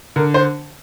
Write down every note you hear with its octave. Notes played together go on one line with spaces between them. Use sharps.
D3 A#4
C5